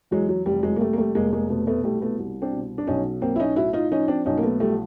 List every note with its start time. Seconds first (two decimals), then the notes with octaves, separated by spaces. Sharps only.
0.11 E2 F#3 G#3
0.29 F#3
0.46 F1 G3
0.63 F#3 G#3
0.76 A#3
0.81 F1 G3 A3
0.93 A#3
0.98 G3 A3
1.15 F1 G#3 A#3
1.33 G#3 A#3
1.50 B2 A3 B3
1.67 A3 B3
1.84 C2 G3 A3
2.01 A3 B3
2.19 C2
2.42 C4 D4
2.53 B2
2.78 D4
2.87 B1 C#4 D#4
3.22 B1 A#3 C4
3.36 E4
3.40 C#4 D#4
3.56 A2 E4 F#4
3.73 D#4 F4
3.92 F3 C#4 D#4
4.08 C4 D4
4.26 B1 C#4 D#4
4.38 A#3
4.43 A3 B3
4.60 F3 G3 A3